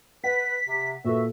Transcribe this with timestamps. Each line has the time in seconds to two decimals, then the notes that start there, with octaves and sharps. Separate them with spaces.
0.24 B4 F#5 B6
0.66 C3
1.04 A#2 F#4 A4 B4 E5